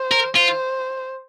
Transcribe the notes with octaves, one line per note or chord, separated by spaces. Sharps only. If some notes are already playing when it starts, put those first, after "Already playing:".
Already playing: C5
A#4
F4 C5